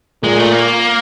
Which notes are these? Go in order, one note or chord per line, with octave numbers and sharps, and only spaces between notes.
A#2 G#3
A3
A#3